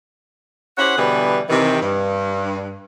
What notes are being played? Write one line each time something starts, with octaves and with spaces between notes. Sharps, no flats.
C#4 E4 G4 C5 F#5
B2 D3 E3 G3 G#4 B4
C3 D#3 E3
G2